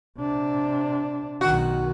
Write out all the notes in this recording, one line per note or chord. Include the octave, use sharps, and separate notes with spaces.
C3 D4
B1 D#3 F#4